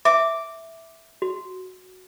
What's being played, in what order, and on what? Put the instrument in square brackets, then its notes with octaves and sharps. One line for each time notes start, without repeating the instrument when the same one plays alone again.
[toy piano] E5 [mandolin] D6
[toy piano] F#4